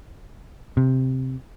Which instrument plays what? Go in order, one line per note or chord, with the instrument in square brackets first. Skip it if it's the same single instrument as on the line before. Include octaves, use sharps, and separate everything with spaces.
[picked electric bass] C3